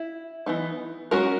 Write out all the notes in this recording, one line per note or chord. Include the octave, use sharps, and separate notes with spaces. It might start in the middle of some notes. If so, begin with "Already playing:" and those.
Already playing: E4
E3 B3 D#4
G#3 C#4 F#4 A#4